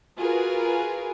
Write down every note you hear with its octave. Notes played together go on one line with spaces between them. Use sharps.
F4 F#4 G#4 A#4 B4